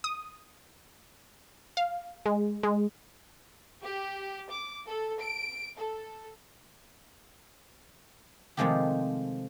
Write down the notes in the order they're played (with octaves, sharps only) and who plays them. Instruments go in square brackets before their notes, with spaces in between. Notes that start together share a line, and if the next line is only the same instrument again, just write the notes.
[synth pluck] D#6
F5
G#3
G#3
[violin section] G4
D6
A4
D7
A4
[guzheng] C3 D#3 F3 G#3 A3 G4